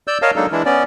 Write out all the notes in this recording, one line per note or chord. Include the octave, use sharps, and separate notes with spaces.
D5 E6 G6
A#4 C#5 D#5 F5 A5
F#3 G#3 A#3 D4 D#4 A4
E3 G#3 D4 E4
B3 C#4 D5